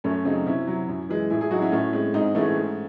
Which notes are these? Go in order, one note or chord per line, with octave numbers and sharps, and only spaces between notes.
F#2 A3 C#4
C#3 F#3 C4 D#4
C3 C#4 E4
F#3
F#2
E3 G#3
A2 E4 G#4
E4 G#4
F#3 D#4 F#4
C#4 E4
A2 A3 C#4
G#3 C4
G#2 C4 D#4
E3 G#3 A3 C#4
G#2